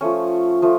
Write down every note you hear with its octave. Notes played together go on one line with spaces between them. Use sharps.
F3 A3 C#4
F3 A3